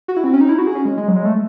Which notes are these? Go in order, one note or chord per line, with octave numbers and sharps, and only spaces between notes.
F#4
E4
C4
C#4
D#4
E4
F#4
G#4
C#4
G#3
G#3
F#3
G#3
A3